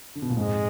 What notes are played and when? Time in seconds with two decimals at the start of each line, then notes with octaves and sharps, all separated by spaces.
0.15 D3
0.22 B2
0.30 A#2
0.37 F2 G#2 G#3